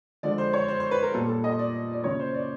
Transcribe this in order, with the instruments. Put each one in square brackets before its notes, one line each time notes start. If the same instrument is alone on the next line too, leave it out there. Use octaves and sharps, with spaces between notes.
[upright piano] D3 F3 G#3 D5
C5
C#5
C5
C5
B4
A#4
A#2 G3 A#3 A4
A4
D#5
D5
D5
C#3 F#3 A#3 C#5
C5
D5